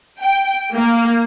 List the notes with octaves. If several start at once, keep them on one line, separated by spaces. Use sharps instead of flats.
G5
A#3